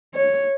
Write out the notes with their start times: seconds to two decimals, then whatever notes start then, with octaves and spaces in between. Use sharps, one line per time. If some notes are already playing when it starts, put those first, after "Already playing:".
0.14 C#5